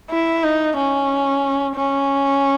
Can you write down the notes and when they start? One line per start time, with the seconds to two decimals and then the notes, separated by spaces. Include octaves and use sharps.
0.10 E4
0.44 D#4
0.77 C#4
1.76 C#4